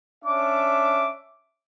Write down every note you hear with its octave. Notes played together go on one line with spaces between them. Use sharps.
C#4 D4 E5 D6